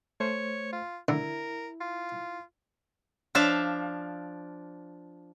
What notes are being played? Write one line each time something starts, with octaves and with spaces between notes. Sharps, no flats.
A3 C5 C#5
F4
D3 E4 A#4
F4
F3 D4 E5 F5